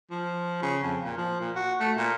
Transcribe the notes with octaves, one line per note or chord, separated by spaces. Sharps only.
F3
C#3
F2
A#2
F3
A#2
F#4
A3
A#2